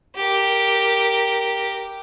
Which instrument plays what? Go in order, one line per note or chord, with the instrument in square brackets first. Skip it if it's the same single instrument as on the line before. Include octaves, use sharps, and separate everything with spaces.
[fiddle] G4 A#4